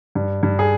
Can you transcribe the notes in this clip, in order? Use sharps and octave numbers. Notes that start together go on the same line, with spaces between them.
G2
G2
G#4